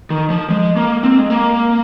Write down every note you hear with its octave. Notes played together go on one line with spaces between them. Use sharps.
D#3
F3
G#3
A#3
C4
G#3
A#3